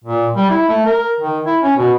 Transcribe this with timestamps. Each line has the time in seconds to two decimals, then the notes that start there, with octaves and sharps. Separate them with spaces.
0.04 A#2
0.35 G3
0.50 E4
0.69 A3
0.86 A#4
1.20 D#3
1.46 E4
1.63 C#4
1.77 B2